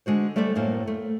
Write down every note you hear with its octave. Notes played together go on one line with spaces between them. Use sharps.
D3 G#3 F#4 C5
G3 A3 A4 C5 D5 E5
F#2 A2 A#3 C5
A3